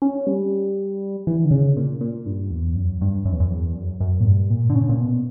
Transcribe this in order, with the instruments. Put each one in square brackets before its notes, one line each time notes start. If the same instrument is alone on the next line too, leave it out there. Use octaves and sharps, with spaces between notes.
[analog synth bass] C#4
G3
E3
D3
C#3
A#2
A#2
G2
E2
F#2
G2
F#2
E2
F#2
E2
F#2
F#2
A#2
G2
A#2
D3
C#3
A#2
B2